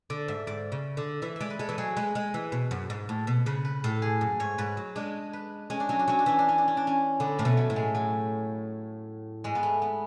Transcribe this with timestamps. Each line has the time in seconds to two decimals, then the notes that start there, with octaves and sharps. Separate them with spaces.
0.10 D3 D5
0.28 G#2 E5
0.47 G#2 D5
0.72 C#3
0.97 D3
1.22 E3 E5
1.36 G#3 D5 E5
1.50 B4
1.59 G#3 A4
1.69 E3
1.78 F#3 G#4
1.97 G#3 B4
2.15 G#3
2.34 E3
2.52 B2
2.71 F#2
2.90 G#2
3.09 A2
3.27 B2
3.46 C#3 B4
3.65 B4
3.84 A2 A4
4.02 G#4
4.21 F#2
4.40 G#2 C#5
4.58 G#2 B4
4.77 F#3
4.95 G#3 D4
5.33 B4
5.70 G#3 C#4
5.80 D4
5.89 F#3 C#4
5.99 D4
6.08 F#3 C#4
6.19 D4
6.26 E3 C#4
6.39 D4
6.49 C#4
6.58 D4
6.68 C#4
6.77 D4
6.87 C#4
7.20 D3 B3
7.39 A2 A3
7.45 B2
7.57 F#3
7.70 A2
7.76 G#3
7.95 F#3
9.44 G#2 G#3
9.55 B3
9.63 A3
9.82 B3